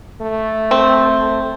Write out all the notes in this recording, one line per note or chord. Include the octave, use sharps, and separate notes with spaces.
A3
C4